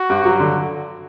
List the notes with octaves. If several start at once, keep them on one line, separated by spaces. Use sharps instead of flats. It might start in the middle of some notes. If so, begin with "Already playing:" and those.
Already playing: F#4
G2
F#3
D3